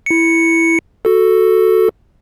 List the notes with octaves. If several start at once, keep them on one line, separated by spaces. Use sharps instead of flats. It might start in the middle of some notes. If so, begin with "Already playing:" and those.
E4 C#7
F#4 A4